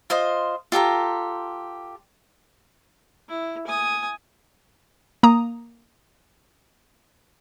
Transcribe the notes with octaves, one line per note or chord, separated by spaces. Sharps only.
F4 C5 D#5
F4 G4 A4 A#5
E4
G#5 D#6
A#3 A#5 D#6